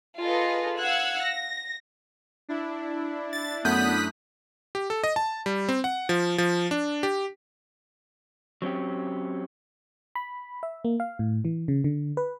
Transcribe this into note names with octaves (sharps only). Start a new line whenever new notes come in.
F4 G#4 A4 B4 D#5
F5 F#5 E6 F#6 G#6
A#6
D4 E4
A6
F#2 A3 B3 D#6 F#6 G6 B6
G4
A4
D#5
A5
G3
C4
F#5
F3
F3
D4
G4
F#3 C4 C#4 G4
B5
E5
A#3
F5
A2
E3
C#3
D3
B4